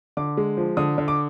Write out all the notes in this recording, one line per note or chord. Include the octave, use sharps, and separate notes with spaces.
D3 D6
G#3
F3
D3 D#6
D3
D6